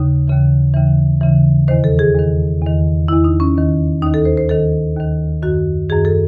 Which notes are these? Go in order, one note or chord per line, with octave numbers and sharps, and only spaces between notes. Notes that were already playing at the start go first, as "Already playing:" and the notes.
Already playing: D#2 C#3 D#4
D#2 C#3 E3
D#2 C#3 E3
D#2 C#3 E3
E2 D#3 C5
A4
G#4
E2 D#3
E2 D#3
E2 D#3 E4
D#4
C#4
D#2 D#3
D#2 D#3 D#4
A4
C5
C5
D#2 D#3 A4
D#2 D#3
F#2 D#3 F#4
F#2 D#3 G#4
A4